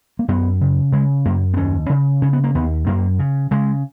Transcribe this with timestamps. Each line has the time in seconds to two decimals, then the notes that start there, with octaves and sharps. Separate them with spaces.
0.19 A#3
0.28 F#2 B3
0.61 C#3
0.92 C#3 G#3
1.25 F#2 A#3
1.54 B3
1.57 D#2 C#4
1.89 C#3
2.22 C#3 C#4
2.33 B3
2.44 A#3
2.55 D#2 B3
2.87 F#2 A#3
3.19 C#3
3.51 C#3 G#3